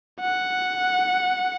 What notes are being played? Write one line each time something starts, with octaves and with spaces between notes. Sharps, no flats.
F#5